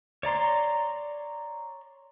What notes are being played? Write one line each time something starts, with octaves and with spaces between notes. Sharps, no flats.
C#5 D5 A#5 C6